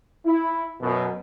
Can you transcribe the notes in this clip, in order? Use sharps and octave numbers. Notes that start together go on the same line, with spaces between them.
E4
F#2 B2